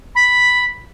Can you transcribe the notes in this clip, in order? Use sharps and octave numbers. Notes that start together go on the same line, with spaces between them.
B5